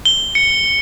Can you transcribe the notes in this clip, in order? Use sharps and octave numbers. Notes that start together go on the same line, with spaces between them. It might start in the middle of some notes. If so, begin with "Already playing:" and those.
G7
C#7